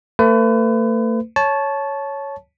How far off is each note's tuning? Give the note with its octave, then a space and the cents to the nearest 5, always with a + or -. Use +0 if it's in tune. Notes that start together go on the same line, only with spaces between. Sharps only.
A3 +40 B4 +35
C#5 +0 A5 -15